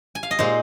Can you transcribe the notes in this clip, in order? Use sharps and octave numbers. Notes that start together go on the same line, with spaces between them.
G#5
F5
D#5
A#2 G#3 D#4 C5